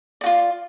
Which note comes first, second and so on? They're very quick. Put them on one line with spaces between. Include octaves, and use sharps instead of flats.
D5 F#4 F4